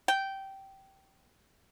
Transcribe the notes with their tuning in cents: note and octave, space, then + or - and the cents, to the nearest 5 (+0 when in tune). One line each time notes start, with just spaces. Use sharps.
G5 -15